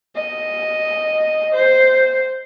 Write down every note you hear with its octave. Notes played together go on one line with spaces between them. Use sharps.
D#5
C5